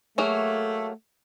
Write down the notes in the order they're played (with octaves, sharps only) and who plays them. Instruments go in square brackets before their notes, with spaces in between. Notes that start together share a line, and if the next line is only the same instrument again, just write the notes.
[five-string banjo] F#3 A#3 G#4 [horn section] A3